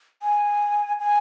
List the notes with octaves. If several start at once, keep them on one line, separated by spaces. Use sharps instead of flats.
G#5
G#5